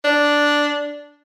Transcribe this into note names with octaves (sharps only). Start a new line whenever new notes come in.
D4